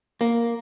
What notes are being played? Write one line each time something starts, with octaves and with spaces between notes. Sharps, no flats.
A#3